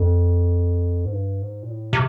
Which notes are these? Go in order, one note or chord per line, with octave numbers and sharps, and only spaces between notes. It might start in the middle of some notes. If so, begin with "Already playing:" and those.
Already playing: F2
G#2
G2
G#2
A#2
A2
C3